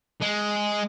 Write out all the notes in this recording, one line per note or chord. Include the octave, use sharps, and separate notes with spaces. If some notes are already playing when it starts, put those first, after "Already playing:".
G#3